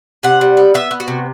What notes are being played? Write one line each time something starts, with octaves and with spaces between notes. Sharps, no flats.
C3 F#5
G3
B3
B3 E5
B3
F#4
C3